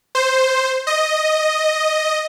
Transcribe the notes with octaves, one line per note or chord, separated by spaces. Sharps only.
C5
D#5